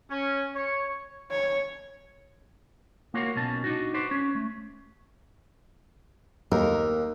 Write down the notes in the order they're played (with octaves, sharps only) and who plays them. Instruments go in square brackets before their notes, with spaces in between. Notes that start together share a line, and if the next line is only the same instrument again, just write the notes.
[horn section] C#4
C#5
[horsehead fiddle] C#5
[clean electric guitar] A#3 F4 F#4 A#4 C#5
B1 B2 C#4 A5
D4 D#4 F#4
F#4 B4 C5 D5
C#4
A3
[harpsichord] D#2 [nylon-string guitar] A#4